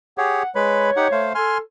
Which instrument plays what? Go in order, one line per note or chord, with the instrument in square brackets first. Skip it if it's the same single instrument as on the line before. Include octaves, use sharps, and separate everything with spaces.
[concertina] G4 G#4 C#5 [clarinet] F#5
[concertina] G#3 B4 B5 [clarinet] C#5
[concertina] D#4 G4 F#5
A3 C5 F5
[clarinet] A4 [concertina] G#5 C6 F6